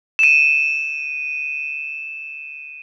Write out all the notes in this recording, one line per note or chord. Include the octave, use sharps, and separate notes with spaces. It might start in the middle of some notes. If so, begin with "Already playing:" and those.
D#7 E7